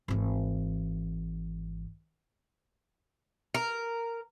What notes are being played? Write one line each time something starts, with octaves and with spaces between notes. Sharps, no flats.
G#1 E3
A#4